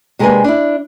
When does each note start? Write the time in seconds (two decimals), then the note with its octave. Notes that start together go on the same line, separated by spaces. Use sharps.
0.19 C3 G#3 A#3 D4 B4 G#5
0.44 D4 E4